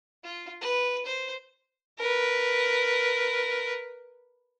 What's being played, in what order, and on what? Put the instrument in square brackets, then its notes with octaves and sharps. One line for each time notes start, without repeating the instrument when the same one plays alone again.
[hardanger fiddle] F4
B4
C5
[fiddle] A#4 B4